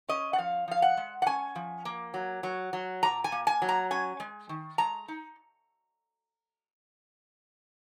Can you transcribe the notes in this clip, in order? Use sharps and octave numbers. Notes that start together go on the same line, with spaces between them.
C#4 D#5
F#5
F3 F5
F3 F5
F#5
G#3
F#5
C#4 G#5
F3
A#3
F#3
F#3
F#3
A#2 A#5
G#5
A#3
G#5
F#3
A#5
C#4 G#5
G#3
D#3
G#3 A#5
D#4